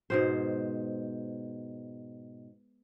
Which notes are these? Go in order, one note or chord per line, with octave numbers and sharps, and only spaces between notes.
G#2 B2 C5